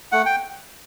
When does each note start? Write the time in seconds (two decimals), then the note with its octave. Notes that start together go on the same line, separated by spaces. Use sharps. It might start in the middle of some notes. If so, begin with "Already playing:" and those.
0.12 A3 F#5
0.26 G5